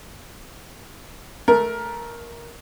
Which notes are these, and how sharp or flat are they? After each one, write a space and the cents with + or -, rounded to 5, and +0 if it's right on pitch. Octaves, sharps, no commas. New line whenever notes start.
A3 -10 A#4 +10